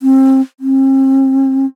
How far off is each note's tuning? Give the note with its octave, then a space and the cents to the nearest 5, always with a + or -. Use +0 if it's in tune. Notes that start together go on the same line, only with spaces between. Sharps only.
C4 +30
C4 +40